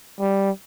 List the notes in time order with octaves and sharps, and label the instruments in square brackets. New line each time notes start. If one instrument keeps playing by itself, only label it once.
[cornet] G3